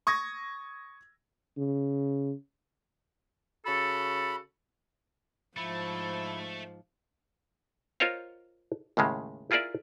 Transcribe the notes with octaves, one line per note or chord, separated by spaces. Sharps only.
C#6 D#6 G#6 A#6
C#3
C#3 F#4 A4 B5
G#2 F3 A3 E4
F4 A#4 C5 C#5 D#5 F5
D#2 A2 C#3 G#3
E4 F4 G#4 A#4 D5 E5